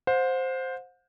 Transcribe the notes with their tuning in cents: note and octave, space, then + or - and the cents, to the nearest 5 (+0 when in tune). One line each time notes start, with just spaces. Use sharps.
C5 +0 F#5 -45